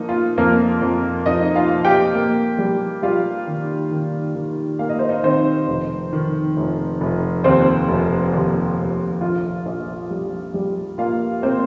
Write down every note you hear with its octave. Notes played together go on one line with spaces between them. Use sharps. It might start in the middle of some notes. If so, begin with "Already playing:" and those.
Already playing: F3 A#3 D#4
F4
F2 A#3 A#4
F2
F2 D#4 D#5
F4 F5
F3
G4 G5
A#3
G3
G3 F4 F5
D#3
D#3
D#3
A#3 F5
D#5
C5
D#4 D#5
D#3 C4 C5
F1
D#3
F1
F1
D#2 C4 C5
F1
D#2
F1
A#1 F4
A#1
G3
G3
A#3 F4 F5
A#3 C4 C5